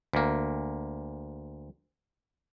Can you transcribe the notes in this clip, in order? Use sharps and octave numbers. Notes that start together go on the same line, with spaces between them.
D2 A#3